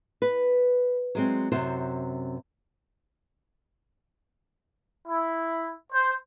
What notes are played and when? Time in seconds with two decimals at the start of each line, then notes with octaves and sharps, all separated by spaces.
0.22 B4
1.15 F#3 G#3 C4
1.52 F#2 C3 F#4 C5
5.08 E4
5.93 C5